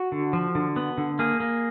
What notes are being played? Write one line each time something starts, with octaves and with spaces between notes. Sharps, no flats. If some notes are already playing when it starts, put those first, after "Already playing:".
Already playing: F#4
D3
F3
D3
B3
D3
A#3 G#4
A#3